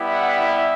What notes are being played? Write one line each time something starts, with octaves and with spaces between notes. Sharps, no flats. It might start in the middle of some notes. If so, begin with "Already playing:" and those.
Already playing: G3 B3 E4 G4
F#5
E5